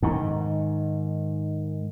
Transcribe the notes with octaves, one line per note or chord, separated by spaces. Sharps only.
G#2 D#3